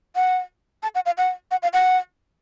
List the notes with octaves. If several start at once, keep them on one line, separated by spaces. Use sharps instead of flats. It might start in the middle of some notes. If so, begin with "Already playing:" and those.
F#5
A5
F#5
F5
F#5
F#5
F5
F#5